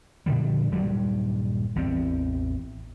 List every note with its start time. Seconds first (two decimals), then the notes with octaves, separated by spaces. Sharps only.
0.26 A#2 D3 F3 G3
0.72 D#1 G2 F#3 G3
1.76 A1 E2 A2 C4